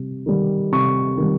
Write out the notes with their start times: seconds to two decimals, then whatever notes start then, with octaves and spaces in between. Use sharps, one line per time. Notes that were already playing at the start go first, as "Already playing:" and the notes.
Already playing: C3 G3
0.26 D#3 G3
0.72 C3 C#6
1.17 D#3 G3